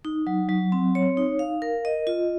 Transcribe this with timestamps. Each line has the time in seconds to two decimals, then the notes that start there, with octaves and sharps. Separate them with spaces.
0.05 D#4
0.27 F#3
0.49 F#3
0.72 C4
0.95 C#5
1.17 D#4
1.39 F5
1.62 A#4
1.85 D#5
2.07 F4